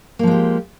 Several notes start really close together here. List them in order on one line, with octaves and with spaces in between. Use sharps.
A#3 F3 G#3 G4